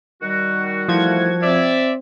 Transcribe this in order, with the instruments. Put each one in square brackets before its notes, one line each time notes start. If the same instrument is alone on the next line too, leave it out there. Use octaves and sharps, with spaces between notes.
[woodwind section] D#3 G3 F#4
[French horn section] E3 A3 E4 [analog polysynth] F3 G#6
[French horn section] C4 C5 [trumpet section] D5 E5